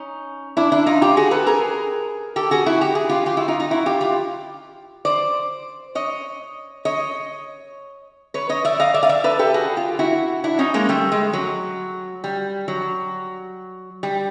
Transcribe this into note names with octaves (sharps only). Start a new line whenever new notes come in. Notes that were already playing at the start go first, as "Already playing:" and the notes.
Already playing: C#4 D#4
D4 E4
D4 E4
D#4 F4
F4 G4
F#4 G#4
A4 B4
G#4 A#4
G4 A4
F#4 G#4
E4 F#4
G4
G#4
F4 G4
F4 G4
E4 F#4
D#4 F4
D#4 F4
E4 F#4
F4 G4
F4 G4
C5 D5
C#5 D#5
C#5 D#5
B4 C#5
C#5 D#5
D5 E5
D#5 F5
D5 E5
F5
D5 E5
A4 B4
G4 A4
F#4 G#4
F4 G4
E4 F#4
D4 E4
C#4 D#4
G#3 A#3
G3 A3
G#3
F#3
G3
F#3
G3